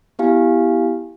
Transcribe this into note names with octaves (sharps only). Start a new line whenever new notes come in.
B3 E4 G4 F5 G#5